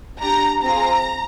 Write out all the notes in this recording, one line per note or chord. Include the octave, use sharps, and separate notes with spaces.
D4 G4 A#5
C4 F4 G#4 A#5